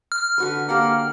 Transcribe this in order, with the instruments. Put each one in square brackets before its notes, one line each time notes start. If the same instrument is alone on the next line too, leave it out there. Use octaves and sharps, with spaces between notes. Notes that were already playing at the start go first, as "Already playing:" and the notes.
[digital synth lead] F6
[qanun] D3 F#4 B4
[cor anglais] A#3 [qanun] G4 F5 F#5